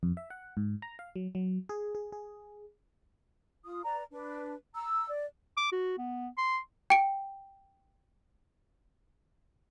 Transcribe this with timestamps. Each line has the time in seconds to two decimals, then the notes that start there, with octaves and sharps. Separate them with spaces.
0.03 F2
0.17 E5
0.30 F#5
0.57 G#2
0.82 A#5
0.99 F5
1.16 F#3
1.35 F#3
1.69 G#4
1.95 G#4
2.12 G#4
3.65 F4 D#6
3.84 B4 D5 A#5
4.12 D4 B4
4.74 A#5 E6
5.08 D5
5.57 D6
5.72 F#4
5.98 B3
6.38 C6
6.90 G5 D7